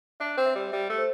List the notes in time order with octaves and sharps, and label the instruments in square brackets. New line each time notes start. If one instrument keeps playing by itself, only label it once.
[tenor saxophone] D4 [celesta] E5
[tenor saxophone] C4
[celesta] E5
[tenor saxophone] G3
[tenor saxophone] G3 [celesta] E5
[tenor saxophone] A3
[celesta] C5